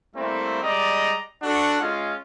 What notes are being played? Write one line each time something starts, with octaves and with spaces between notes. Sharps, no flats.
G3 A3 A#3 C4 E4
G3 G#3 D5 D#5 A#5
D4 F#4 A4 F#5
G#3 C#4 F4